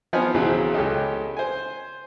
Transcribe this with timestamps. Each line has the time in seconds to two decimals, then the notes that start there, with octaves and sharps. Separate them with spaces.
0.13 F3 B3 C4 D#4 G#5 F6
0.34 B1 C#3 E3 F#3 C4
0.74 C#2 C#4 G4 A4 D#5
1.37 C5 G#5